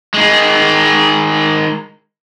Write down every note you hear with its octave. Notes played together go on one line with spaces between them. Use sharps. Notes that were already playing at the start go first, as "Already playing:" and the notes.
D#3 G#3